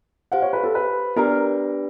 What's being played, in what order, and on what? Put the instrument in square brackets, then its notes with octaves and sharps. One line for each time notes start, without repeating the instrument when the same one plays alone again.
[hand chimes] G4 C5 F5 [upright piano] F#5
[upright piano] C#5
B4
A4
B4
[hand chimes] B3 D4 G4 B4 D5 [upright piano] A#4